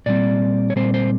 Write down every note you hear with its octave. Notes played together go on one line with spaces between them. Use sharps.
A#2 G3 C4 D5
C#5
A#2 G3 C4 C5
C5